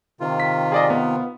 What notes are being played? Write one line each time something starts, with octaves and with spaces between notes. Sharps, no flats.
C3 D#3 F4
B6
G#4 D5 D#5
B3